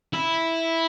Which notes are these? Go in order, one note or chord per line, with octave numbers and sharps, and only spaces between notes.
E4